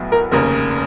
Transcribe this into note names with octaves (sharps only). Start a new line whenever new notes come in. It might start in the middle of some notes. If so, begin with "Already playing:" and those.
Already playing: B1 A2 F#3 B3
A#4
F1 D#2 C#3 A#4